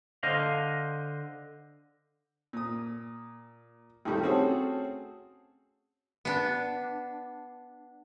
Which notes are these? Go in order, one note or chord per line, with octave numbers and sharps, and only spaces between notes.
D3 C5 D#5 F5
A#2 D#6
C2 A2 D#3 G3 A3
A3 C4 C#4 F#4 G#4 A4
B3 D4